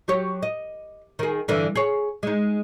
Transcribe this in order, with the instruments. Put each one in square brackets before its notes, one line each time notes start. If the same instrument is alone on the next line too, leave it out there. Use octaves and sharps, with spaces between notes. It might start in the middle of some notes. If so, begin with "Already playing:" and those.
[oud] F#3 G4 C#5
D#5
D#3 G#4
G2 D3 E3
G#4 C#5
G#3 D#4